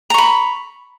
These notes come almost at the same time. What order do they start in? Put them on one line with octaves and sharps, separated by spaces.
A#5 C#6 B5